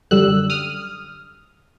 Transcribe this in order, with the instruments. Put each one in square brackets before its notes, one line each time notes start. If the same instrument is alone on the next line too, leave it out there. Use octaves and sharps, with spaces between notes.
[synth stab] F#2 D3 G3 E6 F#6
D#6 F6